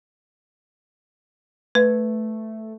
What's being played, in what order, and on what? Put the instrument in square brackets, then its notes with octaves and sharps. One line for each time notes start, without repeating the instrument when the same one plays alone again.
[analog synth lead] A3 [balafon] B4